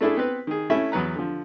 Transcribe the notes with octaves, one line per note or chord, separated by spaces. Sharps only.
A3 D4 E4 G#4 A4
B3 C4 B4
D#3 G#4
A3 C#4 E4 E5
E2 F#3 B3 B4 A#5
D3 F3